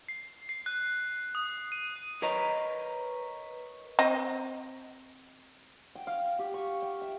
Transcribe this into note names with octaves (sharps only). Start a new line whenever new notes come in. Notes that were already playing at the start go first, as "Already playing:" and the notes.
C7
C7
F#6
D#6
D#7
A#4 B4 C#5 D#5 A#5
C4 D#5
G5
F5
G4
C#6
G5
E5